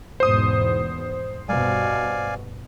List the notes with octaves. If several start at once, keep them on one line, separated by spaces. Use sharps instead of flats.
E2 G#2 B2 C5 D#6
G2 B2 D5 F5 G#5